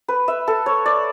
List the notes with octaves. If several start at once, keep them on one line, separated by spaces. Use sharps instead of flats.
B4
E5
A4
C#5
D5